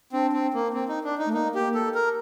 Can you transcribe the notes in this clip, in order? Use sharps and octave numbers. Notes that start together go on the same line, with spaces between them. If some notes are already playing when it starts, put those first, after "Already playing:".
C4 D4
C4
A#3
C4
D#4
D4
D#4
A3
A#3 D#4
G4
A4
A#4